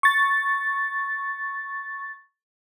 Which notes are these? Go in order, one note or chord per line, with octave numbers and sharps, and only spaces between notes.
C#6 A6